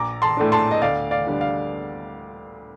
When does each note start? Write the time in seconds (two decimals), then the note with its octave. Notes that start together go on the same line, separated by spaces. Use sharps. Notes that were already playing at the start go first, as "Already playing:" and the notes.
Already playing: A#1 A#5 D6
0.22 A5 C6
0.37 A2 A3 D4
0.52 A5 C6
0.71 D#5
0.82 D2 D5 F5
1.11 D5 F5
1.27 D3 G3 D4
1.41 F5